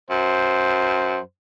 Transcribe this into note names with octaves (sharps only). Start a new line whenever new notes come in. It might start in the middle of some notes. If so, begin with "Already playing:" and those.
F#2 C5